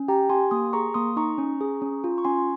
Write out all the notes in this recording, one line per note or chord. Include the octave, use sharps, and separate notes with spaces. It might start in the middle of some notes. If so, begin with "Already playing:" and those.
Already playing: C#4
G4 G5 A#5
G4 G#5 C6
A#3 C6 D#6
G#4 A#5 C#6
A#3 C6 D#6
D#4 A#5 C#6
C#4
G#4
C#4
F4
C#6
C#4 G#5 C6